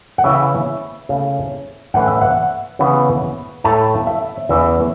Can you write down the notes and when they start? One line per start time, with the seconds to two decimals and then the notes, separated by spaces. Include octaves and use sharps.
0.18 F#5
0.24 C#3 E3 C#4 E4 E5
1.09 C#3 A3 E4
1.94 A2 E3 C#4 F#5
2.08 E5
2.21 F#5
2.79 C#3 E3 B3
3.64 A2 A3 E4 A5
4.07 E5
4.49 E2 E3 C#4 E4 E5